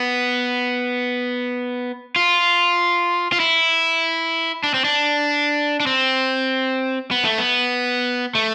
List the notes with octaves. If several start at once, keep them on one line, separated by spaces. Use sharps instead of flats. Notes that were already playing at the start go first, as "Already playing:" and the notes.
Already playing: B3
F4
F4
E4
D4
C4
D4
D4
C4
B3
A3
B3
A3